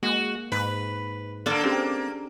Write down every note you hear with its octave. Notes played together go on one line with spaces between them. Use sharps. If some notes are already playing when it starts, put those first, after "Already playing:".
G#3 A#3 F#4
G#2 B4
D3 A#3 D4 A4 D5
A#3 C4 C#4 G4 G#4